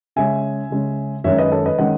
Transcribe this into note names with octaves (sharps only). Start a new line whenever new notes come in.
C#3 G#3 C#4 E5 G#5
C#3 G#3 C#4
F#2 D#3 G#3 C#4 C#5 E5
B4 D#5
A4 C#5
B4 D#5
D#3 G#3 C#4 D#5 F#5